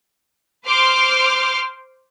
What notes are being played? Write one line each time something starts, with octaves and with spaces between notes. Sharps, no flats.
C5 C6 D6 F6